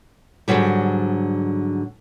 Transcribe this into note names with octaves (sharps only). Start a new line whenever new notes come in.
G#2 D3 D#3 F#3 G3